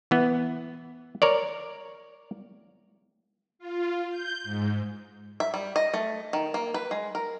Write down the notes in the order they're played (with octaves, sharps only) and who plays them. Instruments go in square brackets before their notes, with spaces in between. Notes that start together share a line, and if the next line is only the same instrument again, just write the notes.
[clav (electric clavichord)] E3 B3
A#4 C#5 D5
[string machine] F4
G6
G#2
[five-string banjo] E5
G3
D#5
A3
D#3
A#3
B4
G#3
A#4